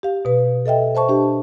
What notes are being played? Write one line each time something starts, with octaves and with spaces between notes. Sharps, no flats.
G4 F5
B2 B4
A4 D#5 E5 G5
C5 E5 A5 C#6
D4 G4